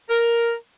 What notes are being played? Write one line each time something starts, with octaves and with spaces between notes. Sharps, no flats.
A#4